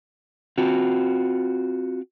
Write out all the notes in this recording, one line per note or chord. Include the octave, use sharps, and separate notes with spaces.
C4 F4 F#4